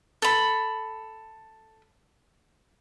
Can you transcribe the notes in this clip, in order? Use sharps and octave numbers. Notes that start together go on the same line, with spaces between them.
A4 B5